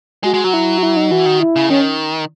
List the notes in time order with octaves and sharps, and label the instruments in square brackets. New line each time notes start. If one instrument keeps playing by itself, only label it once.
[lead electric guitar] G#3 [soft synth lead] F#4
[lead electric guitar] G#3 [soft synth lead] F#4
[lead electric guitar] F#3 [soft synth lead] F#4
[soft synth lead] E4
F#4
E4
D#4
[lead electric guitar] E3 [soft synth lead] F#4
[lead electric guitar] D#3
[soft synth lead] E4
[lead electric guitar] C#3
[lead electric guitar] D#3 [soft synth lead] C#4